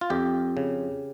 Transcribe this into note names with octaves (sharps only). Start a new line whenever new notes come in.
F4
F2 G4
C#3